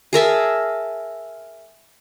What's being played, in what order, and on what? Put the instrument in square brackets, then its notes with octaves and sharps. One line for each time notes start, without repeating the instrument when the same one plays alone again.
[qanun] G#4 A#4 E5 A5